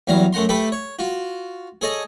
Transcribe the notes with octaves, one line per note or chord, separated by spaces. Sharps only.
E2 F#3 G3 F5 A#5
F#2 A3 F#5 A#5 C6
A3 G4 A4 B4 B5
C#5
F4 F#4
G#4 A4 C#5 D#5